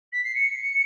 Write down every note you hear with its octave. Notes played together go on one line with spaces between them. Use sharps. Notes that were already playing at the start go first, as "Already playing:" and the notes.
B6
C7
C#7